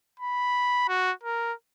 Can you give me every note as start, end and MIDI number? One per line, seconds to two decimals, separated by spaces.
0.20 0.87 83
0.88 1.12 66
1.23 1.53 70